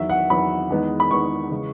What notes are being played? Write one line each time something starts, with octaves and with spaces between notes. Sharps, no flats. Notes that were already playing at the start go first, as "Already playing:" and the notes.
Already playing: E2 D#3 F#3 E5
F#5
E2 D#3 F#3 B5
E2 D#3 G#3 B3 D#4
B5
E2 D#3 G#3 B3 D#4 C#6
C#3 E3 G#3